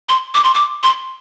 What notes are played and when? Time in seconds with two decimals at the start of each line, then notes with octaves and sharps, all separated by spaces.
0.09 C6
0.34 D6
0.44 C6
0.54 D6
0.83 C6